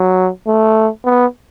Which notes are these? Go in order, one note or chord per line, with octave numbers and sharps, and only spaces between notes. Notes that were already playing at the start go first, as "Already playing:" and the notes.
Already playing: F#3
A3
B3